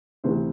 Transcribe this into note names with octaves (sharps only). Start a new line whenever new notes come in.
D2 C3 E3 C5